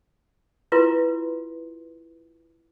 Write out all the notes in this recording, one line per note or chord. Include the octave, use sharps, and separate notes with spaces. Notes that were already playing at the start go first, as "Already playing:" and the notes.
E4 F4 B4 C6